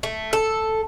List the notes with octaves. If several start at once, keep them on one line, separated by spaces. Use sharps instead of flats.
A3
A4